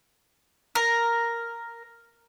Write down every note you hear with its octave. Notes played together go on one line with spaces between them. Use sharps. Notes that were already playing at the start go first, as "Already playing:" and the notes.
A#4